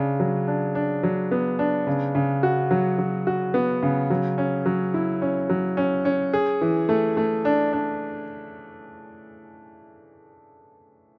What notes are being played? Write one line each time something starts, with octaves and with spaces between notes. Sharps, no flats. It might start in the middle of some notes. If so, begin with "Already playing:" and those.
Already playing: C#3 D4
F#3
D4
D4
F#3
B3
D4
C#3
C#3
F#4
F#3
F#3
F#4
B3
C#3
F#3
C#4
F#3
E4
C#4
F#3
C#4
C#4
G#4
E3
A3
A3
D4
D4